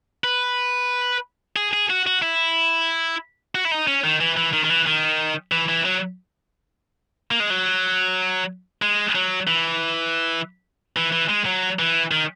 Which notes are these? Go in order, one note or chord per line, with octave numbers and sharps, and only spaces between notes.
B4
G#4
G#4
F#4
F#4
E4
F#4
E4
D#4
C#4
D#3
E3
E3
D#3
D#3
E3
D#3
E3
E3
F#3
A#3
G#3
F#3
G#3
F#3
E3
E3
E3
G#3
F#3
E3
D#3